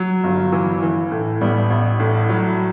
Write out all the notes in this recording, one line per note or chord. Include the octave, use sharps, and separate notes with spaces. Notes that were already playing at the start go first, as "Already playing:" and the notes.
Already playing: F#3
G1
E3
E3
A2
A1 G3 B3
A1
A2
F#3